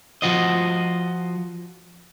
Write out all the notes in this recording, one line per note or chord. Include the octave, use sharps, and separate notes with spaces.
F3 F4 F#4 C5 D#5